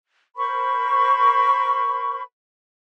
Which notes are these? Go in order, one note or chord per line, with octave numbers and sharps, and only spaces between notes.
A#4 C5 B5 C#6